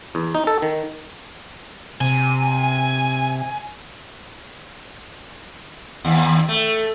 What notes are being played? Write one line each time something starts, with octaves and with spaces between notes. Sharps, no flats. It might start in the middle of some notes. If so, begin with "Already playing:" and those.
E2
D#4
A4
D#3
C3 G#5
D#2
A3